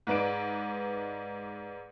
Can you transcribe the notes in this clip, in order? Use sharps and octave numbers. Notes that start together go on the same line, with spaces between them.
G#2 G#3 B4 D5 D7